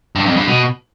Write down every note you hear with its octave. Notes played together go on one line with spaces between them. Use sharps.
G2
F2
G2
B2